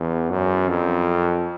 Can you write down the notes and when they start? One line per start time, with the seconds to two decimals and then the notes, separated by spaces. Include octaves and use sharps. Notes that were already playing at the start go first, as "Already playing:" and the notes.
Already playing: E2
0.30 F#2
0.69 F2